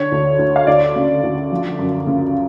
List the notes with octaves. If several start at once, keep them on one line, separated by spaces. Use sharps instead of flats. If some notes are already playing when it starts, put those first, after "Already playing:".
Already playing: D3 C#5
D2
D2
F5
D2 D5
C#3
D2
F3
F#2
C#3